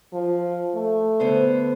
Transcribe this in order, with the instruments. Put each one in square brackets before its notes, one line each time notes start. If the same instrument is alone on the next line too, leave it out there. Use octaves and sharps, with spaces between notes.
[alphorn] F3
A3
[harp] D3 B3 C5